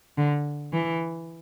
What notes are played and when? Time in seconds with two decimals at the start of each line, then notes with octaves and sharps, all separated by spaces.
0.17 D3
0.73 E3